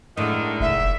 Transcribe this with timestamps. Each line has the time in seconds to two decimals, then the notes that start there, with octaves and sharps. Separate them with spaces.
0.17 A2 D3 D#3 G#3
0.61 F1 E5